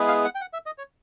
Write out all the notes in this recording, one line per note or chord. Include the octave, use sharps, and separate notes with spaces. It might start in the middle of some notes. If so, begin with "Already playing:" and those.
Already playing: G#3 B3 E4 G#4
F5
F#5
G5
F#5
E5
D#5
C#5